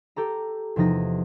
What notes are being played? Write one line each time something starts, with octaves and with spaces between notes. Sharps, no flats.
G4 A4 A#5
E2 C3 F3 D#4 A#6